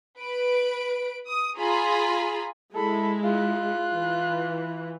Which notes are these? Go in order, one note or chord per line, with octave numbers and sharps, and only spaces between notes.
B4 D7
D#6
F4 G#4 G#5 A#5 B5
G#3 E4 A4 B5
F4 F#6
E3